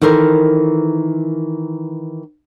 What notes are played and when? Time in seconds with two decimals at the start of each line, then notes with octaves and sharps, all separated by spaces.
0.01 D#3 E3 A4 A#4 C5